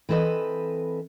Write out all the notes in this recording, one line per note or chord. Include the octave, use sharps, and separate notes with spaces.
E3 C4 A4 B4 D#5